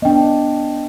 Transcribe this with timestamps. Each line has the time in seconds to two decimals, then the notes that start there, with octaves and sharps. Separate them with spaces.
0.02 B3 D4 D#5 G5